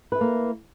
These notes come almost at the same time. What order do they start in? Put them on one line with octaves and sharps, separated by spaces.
B4 E4 A4 A#3